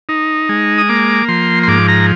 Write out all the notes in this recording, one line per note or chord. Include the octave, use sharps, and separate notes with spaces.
D#4
G#3
D#6
A#3 D6
F3 C6
C6
G#2 D6
A#5